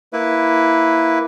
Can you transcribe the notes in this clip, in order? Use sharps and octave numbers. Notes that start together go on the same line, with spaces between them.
A#3 E4 B4